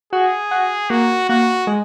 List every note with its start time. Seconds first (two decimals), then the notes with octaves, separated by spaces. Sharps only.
0.13 F#4 G#4
0.51 F#4
0.90 A#3 F#4
1.29 A#3 F#4
1.67 G#3